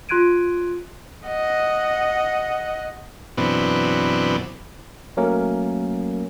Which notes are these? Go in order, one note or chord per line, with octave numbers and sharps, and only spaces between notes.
F4 C6 F#6 G#6 D7 D#7
D#5 F#5
F#2 B2 E3 B3 C4 D4
F#3 A3 A#3 C#4 A#4